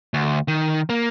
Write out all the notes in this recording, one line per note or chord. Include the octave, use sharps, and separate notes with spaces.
D2
D#3
A#3